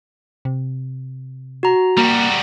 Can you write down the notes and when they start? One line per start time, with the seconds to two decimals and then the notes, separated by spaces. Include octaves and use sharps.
0.45 C3
1.63 F#4 A#5
1.97 G3 A#3 F#4 A#5